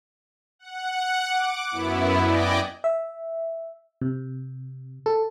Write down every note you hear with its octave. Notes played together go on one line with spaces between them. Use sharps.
F#5
D6
F#2 B3 E4
D5 D#5 G5 G#5 D6
E5
C3
A4